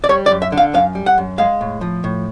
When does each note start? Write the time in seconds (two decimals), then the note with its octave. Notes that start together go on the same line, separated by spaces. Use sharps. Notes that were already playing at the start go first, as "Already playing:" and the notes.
0.04 D5
0.09 G3 C#5
0.26 D5
0.31 F#2
0.42 E5
0.52 D3
0.57 F5
0.74 F#2 F5
0.95 G3
1.06 F#5
1.18 F#2
1.38 G#3 F5
1.61 A2
1.81 F3
2.04 A2